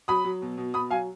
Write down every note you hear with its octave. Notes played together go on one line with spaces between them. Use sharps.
F#3 B5 D#6
F#3
B2
B2
B2 B5 D#6
F#3 F5 G#5